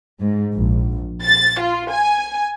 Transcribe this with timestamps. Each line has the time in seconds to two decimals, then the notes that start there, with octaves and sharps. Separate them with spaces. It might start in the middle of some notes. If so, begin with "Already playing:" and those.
0.20 G#2
0.54 A#1
1.22 A6
1.60 F4
1.91 G#5